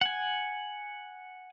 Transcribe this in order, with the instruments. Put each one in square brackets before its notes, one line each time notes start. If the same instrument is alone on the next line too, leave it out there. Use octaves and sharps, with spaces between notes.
[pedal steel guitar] F#5 G#5